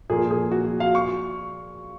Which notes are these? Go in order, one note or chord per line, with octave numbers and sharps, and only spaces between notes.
A#2 F3 A#3 G#4
G#4
F#4
F#4
F5
C#6